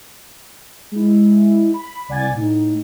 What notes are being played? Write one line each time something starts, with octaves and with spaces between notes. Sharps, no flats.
G#3 E4
B5
C2 D5 F#5 G#5 G#6 A6
A2 D#4